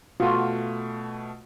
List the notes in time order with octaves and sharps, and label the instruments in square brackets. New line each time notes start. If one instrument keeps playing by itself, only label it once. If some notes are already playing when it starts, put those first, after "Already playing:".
[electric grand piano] B2 A3 [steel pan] F4 F#4